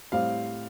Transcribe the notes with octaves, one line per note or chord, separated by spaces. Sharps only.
A2 G3 C4 F5